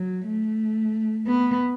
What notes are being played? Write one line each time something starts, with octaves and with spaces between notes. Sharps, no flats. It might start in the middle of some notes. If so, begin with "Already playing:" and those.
Already playing: F#3
A3
B3